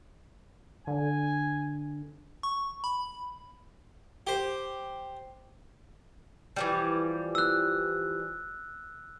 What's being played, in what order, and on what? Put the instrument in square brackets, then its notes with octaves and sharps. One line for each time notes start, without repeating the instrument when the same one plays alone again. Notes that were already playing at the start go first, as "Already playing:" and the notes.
[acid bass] D3 [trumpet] G#5
[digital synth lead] C#6
B5
[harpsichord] G4 C5
[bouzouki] E3 F3 G3
[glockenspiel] E6 F#6